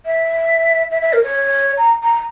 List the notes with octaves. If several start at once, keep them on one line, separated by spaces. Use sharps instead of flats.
E5
E5
E5
A#4
C#5
A#5
A#5